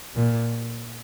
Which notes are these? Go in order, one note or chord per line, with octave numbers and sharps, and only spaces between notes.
A#2